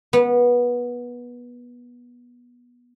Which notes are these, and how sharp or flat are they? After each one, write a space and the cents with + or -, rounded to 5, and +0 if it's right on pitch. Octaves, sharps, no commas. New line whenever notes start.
B3 -20